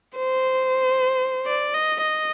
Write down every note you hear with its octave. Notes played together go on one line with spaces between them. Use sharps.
C5
D5
D#5
D#5